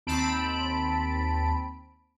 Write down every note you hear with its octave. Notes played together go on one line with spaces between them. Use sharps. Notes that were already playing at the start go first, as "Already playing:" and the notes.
D#2 C4 A5 B5 D7